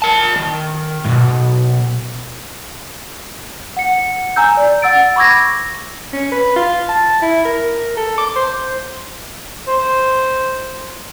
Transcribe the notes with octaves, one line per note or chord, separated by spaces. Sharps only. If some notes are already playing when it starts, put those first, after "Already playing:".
A#4 A5
D#3
B1 G2
F#5 C#7
G#5 A#5 E6 G6
D5
F#5 E6 A6 D7
B5 C#6 D6 E6 G#6 A#6
C#4
B4
F4
A5
E4
A#4
A4
D6
C5
C5